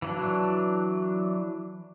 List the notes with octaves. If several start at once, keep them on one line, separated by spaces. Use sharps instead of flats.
E3 F#3 D4